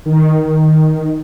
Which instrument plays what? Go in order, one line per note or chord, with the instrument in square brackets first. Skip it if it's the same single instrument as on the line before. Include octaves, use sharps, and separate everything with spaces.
[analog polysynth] D#3